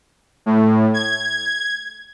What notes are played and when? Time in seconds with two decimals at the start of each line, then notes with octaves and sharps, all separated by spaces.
0.46 A2
0.94 G#6